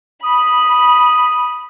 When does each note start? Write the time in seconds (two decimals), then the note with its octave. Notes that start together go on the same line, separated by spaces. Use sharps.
0.24 B5 D#6